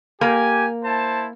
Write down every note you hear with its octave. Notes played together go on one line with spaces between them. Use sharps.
A#3 G4 G#5
E4 C5 A5